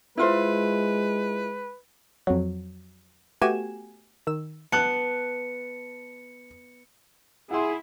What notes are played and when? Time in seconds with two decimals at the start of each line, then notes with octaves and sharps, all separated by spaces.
0.17 G#3 E4 F4 B4 C5
2.27 F2 F#3
3.42 A3 B3 F#4 G4 G#5 E7
4.27 D#3 E6
4.72 B3 A5 F#6 C#7
7.51 E4 G#4 F#5 C6